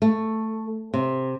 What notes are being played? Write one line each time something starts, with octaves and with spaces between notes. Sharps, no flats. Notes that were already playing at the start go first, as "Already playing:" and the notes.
A3
C3